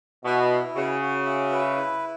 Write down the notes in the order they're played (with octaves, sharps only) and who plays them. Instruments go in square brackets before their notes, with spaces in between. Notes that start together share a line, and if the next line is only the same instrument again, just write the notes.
[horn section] B2 [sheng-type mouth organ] E4
[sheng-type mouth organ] E4
[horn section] C#3 [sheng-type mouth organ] F#4
[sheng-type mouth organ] F#4
E5
B4
E4